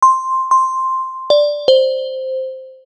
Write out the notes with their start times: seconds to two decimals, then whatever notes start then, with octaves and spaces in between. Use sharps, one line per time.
0.02 C6
0.51 C6
1.30 D5
1.68 C5